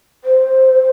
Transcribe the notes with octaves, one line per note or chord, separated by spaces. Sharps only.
C5